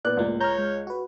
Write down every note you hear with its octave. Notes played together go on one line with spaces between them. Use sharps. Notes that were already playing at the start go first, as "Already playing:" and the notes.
A#2 B3 D5 F#6
C#2 A2 A#3
C#5 A#5 F6 G6
G#3
F#4 B4